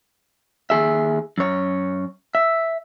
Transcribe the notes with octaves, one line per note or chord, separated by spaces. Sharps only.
D#2 G#4 E5
F#2 C#5
E5